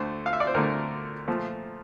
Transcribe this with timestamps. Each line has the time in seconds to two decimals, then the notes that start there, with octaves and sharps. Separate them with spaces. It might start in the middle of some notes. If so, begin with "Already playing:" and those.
Already playing: D2 D3 A3 C5
0.26 F5
0.33 E5
0.40 D5
0.47 C5
0.54 D2 D3 A3 A#4
1.28 A#2 F3 A3